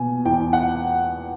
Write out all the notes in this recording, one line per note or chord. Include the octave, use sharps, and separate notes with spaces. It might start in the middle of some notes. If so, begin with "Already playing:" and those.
Already playing: B2 A#3 G#5
E2 G5
F#5